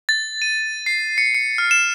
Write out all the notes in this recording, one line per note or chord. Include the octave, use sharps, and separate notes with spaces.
A6
D#7
C7
C#7
C#7
F6
E7